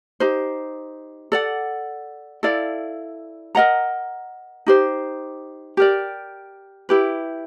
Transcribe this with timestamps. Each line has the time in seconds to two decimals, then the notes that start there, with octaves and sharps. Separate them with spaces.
0.20 D#4 G4 C5
1.32 A4 D5 F#5
2.43 E4 A4 D5 F5
3.55 A#4 D#5 F#5 A#5
4.66 D#4 G4 C5
5.77 G4 A#4 D5
6.89 E4 G4 B4